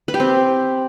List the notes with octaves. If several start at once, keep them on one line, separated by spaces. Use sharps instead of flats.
B4
G4
C4